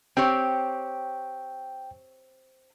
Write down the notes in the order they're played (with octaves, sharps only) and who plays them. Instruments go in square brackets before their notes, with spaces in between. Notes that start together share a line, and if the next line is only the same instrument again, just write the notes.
[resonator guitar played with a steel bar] C4 G4 C#5 [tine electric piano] G5